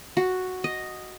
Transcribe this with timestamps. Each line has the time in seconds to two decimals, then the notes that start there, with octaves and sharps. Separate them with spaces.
0.17 F#4
0.64 D#5